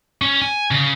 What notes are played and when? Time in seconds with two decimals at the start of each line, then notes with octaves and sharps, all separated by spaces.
0.22 C#4
0.41 G#5
0.71 C#3